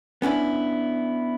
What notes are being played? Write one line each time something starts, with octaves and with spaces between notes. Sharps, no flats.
B3 C#4 D4 E4